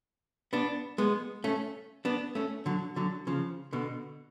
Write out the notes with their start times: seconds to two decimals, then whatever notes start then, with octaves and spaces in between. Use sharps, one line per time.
0.53 B3 D4
0.98 G#3 B3
1.44 A3 C#4
2.05 B3 D4
2.35 A3 C#4
2.66 D3 F#3
2.96 D3 F#3
3.27 C#3 F3
3.73 B2 D3